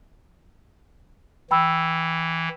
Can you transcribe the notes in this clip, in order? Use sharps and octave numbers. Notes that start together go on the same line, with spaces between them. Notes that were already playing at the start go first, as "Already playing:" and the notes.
E3 G5 B5 E6